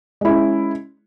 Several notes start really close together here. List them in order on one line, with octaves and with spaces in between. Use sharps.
G#3 E4 C#4